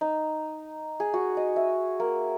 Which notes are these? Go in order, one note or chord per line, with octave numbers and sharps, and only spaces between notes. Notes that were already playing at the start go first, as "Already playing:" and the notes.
D#4
G#4
F#4
D#5
E5
A#3